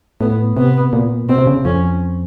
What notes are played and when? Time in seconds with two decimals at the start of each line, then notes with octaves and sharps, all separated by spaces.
0.20 A2 B3
0.57 C3 B3
0.93 A#2
1.29 B2 C4
1.38 C3
1.47 C#3
1.65 F2 C#4